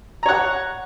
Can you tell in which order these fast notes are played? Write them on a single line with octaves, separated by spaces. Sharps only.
A#5 C#5 F#5